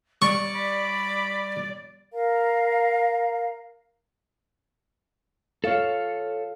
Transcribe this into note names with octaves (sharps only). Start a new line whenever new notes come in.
G3 D5 C#6
B5
A#4 F5 A#5
F4 A4 C#5 F5